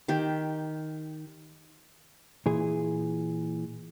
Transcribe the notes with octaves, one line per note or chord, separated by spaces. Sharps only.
D#3 G4 G5
A#2 E3 G#4